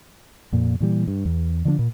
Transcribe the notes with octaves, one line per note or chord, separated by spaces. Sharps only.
F2 A#2
A#2 E3 G3
G2
E2
D3 F3 A#3 D4
A#2